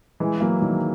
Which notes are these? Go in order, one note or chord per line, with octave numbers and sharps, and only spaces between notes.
E3 G#3
F#3 A#3
D#3 F#3